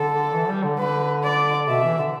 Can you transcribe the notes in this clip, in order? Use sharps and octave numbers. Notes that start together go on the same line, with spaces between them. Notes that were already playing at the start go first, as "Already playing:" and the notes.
Already playing: D3 A4
E3
G3
D3
D3 B4
D5
B2 E5
E3
D3